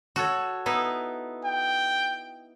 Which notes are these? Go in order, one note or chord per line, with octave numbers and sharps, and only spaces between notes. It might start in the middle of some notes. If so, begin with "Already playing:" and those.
F#4 A4 C#5
B3 D#4 E4
G5